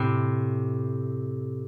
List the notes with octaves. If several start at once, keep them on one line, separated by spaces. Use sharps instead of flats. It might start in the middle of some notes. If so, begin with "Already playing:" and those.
Already playing: A2 C3